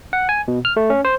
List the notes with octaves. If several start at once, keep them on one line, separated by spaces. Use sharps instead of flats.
F#5
G#5
B2
F6
A3
C#4
C5